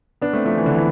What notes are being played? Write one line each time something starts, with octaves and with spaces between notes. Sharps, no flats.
B3 D4
A3 C4
F3 A3
E3
D3
E3